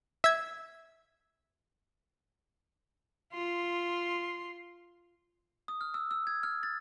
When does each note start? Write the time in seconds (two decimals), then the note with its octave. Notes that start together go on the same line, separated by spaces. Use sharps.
0.24 E5 G#6
3.33 F4 C6
5.68 D#6
5.81 F6
5.94 E6
6.11 E6
6.27 G#6
6.43 F6
6.63 A6